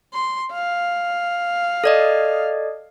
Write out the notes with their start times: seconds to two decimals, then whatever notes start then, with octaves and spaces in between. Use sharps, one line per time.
0.14 C6
0.52 F5
1.84 A4 D5 D#5